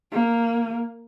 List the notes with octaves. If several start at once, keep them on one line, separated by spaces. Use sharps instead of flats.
A#3